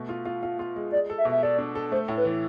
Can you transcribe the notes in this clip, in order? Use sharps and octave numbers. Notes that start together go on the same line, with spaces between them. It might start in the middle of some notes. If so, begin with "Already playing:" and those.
Already playing: B2 A3
F4
F4
F4
F4
G#3
G#3 D5
A4
E5
B2
E5
A4 D5
D4
A4
A3 C5
A2
B4
E3